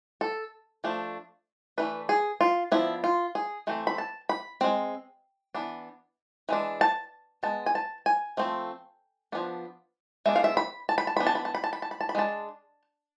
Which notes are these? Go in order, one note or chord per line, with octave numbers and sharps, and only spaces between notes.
A4
F3 A3 D4
E3 A3 D4 B4
G#4
F4
F3 B3 D4 E4
F4
G#4
E3 A3 C4
B5
A5
B5
G#3 C4
E3 B3 D4
E3 G#3 D4
A5
G#3 B3 A5
G#5
A5
G#5
F3 A3 C4
F3 G#3 B3 D4
G#3 B3 D4 E5
F5
E5
B5
A5
B5
A5
E3 B3 D4 B5
A5
B5
A5
B5
A5
B5
A5
B5
A5
B5
G#3 D4 A5